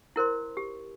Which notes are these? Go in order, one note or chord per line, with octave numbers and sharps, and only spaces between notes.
E4 A#4 C5 C6
G4